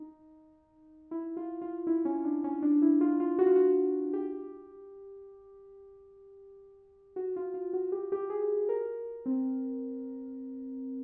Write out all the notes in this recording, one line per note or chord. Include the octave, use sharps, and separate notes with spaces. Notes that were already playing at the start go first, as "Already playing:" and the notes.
Already playing: D#4
E4
F4
F4
E4
C#4
D4
C#4
D4
E4
F4
F4
F#4
F4
F#4
G4
F#4
F4
F4
F#4
G4
G4
G#4
A#4
C4